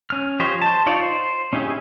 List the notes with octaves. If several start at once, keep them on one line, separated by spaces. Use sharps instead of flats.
C#4 F6
F3 G4 C5 C#5 D#5
C5 A5
D#4 F4 C#5 D5
C5
C#4 D#4 E4 G4 G#4